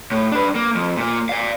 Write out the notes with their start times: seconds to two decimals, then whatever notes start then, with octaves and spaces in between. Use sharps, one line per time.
0.12 A2
0.32 D4 B4
0.55 A#3
0.75 F2
0.97 A#2 A#3
1.29 D5 F5